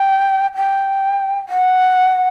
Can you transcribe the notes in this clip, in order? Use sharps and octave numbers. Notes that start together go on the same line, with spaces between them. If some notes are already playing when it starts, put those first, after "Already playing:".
Already playing: G5
G5
F#5